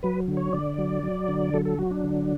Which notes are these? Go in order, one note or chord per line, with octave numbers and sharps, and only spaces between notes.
F#3 B4
D3
C#5
D3 D5
F#3
F#3
D3
F#3 A4
A4
F#3 F#4
D4
D3